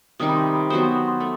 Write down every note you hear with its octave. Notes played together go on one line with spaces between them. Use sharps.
C3 D#3 G3 D#4 D#6
B5
C6
B5
F#3 B3 F#4 C5 D#6
C6
B5
C6
A3 E6